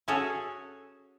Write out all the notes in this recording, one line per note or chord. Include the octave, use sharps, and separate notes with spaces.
C#4 F#4 G#4 A4 C#5